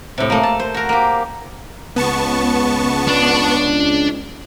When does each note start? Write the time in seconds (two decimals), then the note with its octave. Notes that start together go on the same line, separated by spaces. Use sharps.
0.18 A2 C3
0.30 A3 A#3
0.43 A5
0.60 C5
0.74 F#4 A#4
0.89 A#3 G4
1.96 C#2 B3 A5 C#6
3.08 D4